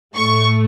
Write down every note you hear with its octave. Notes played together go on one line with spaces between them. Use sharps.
A2 A3 C#6